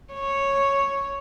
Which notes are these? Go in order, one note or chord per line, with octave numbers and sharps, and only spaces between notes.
C#5